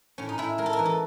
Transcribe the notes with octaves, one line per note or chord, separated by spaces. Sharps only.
A2 C#4
D#4
A2 E4
G#3 A#4
A4
A#4
E3
A4